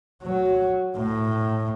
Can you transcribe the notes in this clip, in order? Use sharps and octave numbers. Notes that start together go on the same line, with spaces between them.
F#3
A2